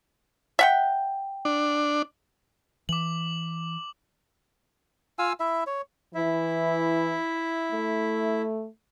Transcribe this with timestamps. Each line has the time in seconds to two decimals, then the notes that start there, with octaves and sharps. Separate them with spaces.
0.59 E5 F#5 G5
1.45 D4
2.89 E3 D6 F#7
5.19 F4 F5 G#5 E6
5.40 E4 E5
5.66 C#5
6.15 E3 E4 E5
7.72 A3